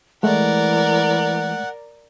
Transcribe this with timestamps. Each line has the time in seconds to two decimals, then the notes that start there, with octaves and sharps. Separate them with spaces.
0.23 E3 G#3 A3 A#4 D5 F#5